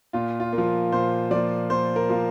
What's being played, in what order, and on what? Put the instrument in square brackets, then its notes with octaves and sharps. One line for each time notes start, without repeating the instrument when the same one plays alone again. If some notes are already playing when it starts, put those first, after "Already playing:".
[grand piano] A#2 F4
F4
A#3
F3
A#2 C5
F3 A#3 D5
A#2 C5
A#4
F3 A#3